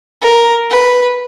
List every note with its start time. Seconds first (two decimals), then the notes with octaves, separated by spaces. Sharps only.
0.22 A#4
0.70 B4